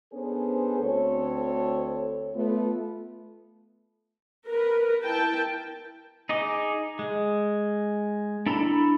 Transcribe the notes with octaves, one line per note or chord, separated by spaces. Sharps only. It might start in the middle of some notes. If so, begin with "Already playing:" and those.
B3 C#4 D4 G#4 A4 C5
D2 C4 A4 C#5
A3 B3 F4
A#4 B4
E4 A#4 G5 A5
D#4 G#4 D#5 D6
G#3
D4 E4 A4 A#5 B5